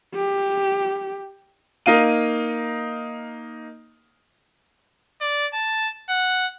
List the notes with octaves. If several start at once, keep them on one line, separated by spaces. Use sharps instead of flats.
G4
A#3 D#4 F5 D#7
D5
A5
F#5